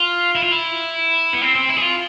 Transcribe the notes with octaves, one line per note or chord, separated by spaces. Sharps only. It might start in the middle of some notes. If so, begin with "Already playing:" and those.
Already playing: F4
E4
F4
E4
B3
C4
C4
E4
G#4
F4